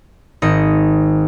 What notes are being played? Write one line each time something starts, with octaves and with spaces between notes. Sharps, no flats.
G#1 D#3 D#5 C#7